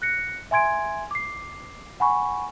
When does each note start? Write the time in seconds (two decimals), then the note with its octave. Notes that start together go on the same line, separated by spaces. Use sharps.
0.02 F#6 A#6 C#7
0.51 E5 G#5 C6 G#6 D7
1.11 D6 C7
2.00 F#5 G#5 B5 C#6